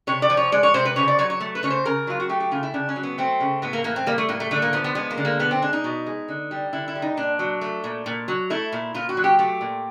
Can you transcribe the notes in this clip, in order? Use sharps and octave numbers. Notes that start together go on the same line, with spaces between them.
C3 C#5
D5
F3
C#5
G#3 D5
C#5
C3 C5
B4
C#3 C#5
D5
F#3 C#5
C#5
A3
B4
C#3 C#5
C5
C#3 A#4
F#3 F4
F#4
A3 G4
G4
C#3 F4
E4
C#3 D4
C#4
F#3
B3
A3 C4
C#3
A2 B3
A#3
E3 A#3
C4
G3 A#3
A3
A2 A#3
A3
D3 A3
A#3
F3 B3
B3
G#3 B3
A#3
D3
A#3
B2 B3
C4
G#3 D4
D#4
B2
G#3
D3
G3
D3 E4
E4
G3
D#4
A#2 D4
F#3
A3
A#2
A#2
F#3
A3 E4
A#2
A#2 F4
F#4
F#3
G4
A3 G4
A#2